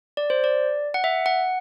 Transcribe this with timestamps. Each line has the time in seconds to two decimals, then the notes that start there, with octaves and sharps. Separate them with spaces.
0.17 D5
0.30 C5
0.44 D5
0.94 F#5
1.04 E5
1.26 F#5